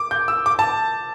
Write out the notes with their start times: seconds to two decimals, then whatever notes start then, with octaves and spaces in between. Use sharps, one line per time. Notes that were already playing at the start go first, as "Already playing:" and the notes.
Already playing: D6
0.11 G6
0.28 E6
0.46 D6
0.59 A5